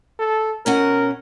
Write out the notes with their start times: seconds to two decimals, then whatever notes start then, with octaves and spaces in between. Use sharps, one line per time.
0.20 A4
0.66 B2 C#4 A#4 F#5